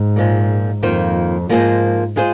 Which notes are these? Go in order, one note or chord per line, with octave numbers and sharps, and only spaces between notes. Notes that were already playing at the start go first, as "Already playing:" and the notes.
Already playing: G#2
A#2 F3 G#3
F2 D#3 A#3 F4 C5
G#2 F3 A#3 D#4 G#4 C5
G#3 F4 G#4 C5